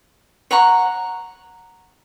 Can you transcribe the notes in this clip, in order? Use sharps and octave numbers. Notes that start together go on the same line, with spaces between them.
C#5 F#5 A#5 C#6